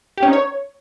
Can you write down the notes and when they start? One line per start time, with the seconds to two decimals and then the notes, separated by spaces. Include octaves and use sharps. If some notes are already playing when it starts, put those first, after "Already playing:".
0.17 G4
0.23 C#4
0.28 D#4
0.33 C#5